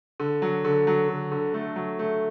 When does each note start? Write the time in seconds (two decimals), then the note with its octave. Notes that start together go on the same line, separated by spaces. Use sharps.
0.20 D3
0.42 F#3
0.65 D3
0.87 F#3
1.09 D3
1.32 D3
1.54 A3
1.76 F#3
1.99 A3